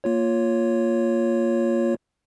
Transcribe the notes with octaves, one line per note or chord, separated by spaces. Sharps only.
A#3 F4 C#5